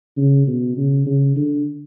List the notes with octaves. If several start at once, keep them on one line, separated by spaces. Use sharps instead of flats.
C#3
B2
C#3
C#3
D3